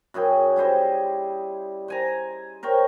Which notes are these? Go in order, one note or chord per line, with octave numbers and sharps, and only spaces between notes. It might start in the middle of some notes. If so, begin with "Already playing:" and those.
F#2 E4 G#4 G5
G3 E4 C5 D#5
C5 G#5 A#5
A#4 C5 C#5 G5